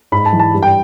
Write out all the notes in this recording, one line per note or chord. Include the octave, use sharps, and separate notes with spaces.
G#2 B5
A5
E3
A5
G2
G5